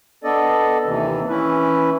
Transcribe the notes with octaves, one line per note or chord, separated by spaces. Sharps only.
B3 D4 A4 D5 D#5
D#2 C3 E3
E3 C#4 E4 B4